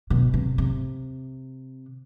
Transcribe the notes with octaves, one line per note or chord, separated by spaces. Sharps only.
B2
C3
C3